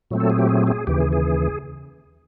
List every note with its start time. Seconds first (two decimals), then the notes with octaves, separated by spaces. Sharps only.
0.11 A#2 F#3 A3 C4
0.20 A4
0.30 G#4
0.39 G4
0.49 G#4
0.67 G#4
0.87 D#2 C#3 E3 G4
1.00 G#4
1.13 G#4